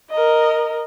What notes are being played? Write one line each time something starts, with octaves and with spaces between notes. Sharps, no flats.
A#4 D#5